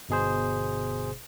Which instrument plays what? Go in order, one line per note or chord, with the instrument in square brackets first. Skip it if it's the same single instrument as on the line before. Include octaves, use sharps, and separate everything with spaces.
[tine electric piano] G1 B2 G#4 C5